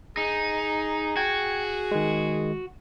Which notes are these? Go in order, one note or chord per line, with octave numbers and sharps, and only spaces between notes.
D#4 G#4
F#4 G5 G#6
D#3 G#3